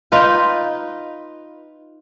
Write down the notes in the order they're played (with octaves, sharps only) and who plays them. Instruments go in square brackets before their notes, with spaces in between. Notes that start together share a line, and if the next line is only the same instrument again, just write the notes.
[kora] D#4 F4 B4 G5